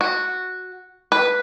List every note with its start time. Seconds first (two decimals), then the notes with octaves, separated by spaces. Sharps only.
0.01 F#4
1.12 B4